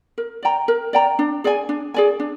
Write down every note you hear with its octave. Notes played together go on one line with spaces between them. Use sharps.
A#4
D5 G5 A#5
A#4
D5 G5 A#5
D4
G#4 D5 G#5
D4
G#4 D5 G#5
D4